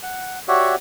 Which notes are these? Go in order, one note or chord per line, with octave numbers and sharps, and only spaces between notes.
F#5
F#4 G4 C#5 D5 E5 F#5